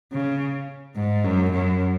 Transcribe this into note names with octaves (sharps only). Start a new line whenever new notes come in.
C#3
G#2
F#2
F#2